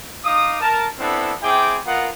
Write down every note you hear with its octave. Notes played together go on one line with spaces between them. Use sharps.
D#4 F5 D6 D#6
A#4 A5
B3 C4 D4 E4 A4
C4 E4 G#4 G5 D6
B3 F4 A#4 D#5 F#5